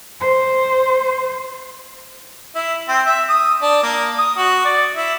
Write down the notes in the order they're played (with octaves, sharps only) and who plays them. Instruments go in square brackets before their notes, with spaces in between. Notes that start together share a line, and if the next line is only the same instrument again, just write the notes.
[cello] C5
[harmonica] E4
C4
E5
D#6
D4
A#3
D#6
F#4
D5
E4